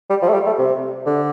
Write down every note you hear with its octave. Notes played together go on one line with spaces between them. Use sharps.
G3
F3
A3
G3
A3
C3
D3